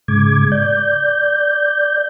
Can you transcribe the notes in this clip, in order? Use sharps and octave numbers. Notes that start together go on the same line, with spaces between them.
G#2 C#3 G#3 D6 G#6
D5 G6